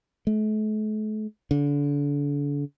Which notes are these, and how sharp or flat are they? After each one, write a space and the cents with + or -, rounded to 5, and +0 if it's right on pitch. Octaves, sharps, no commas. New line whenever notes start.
A3 -40
D3 -35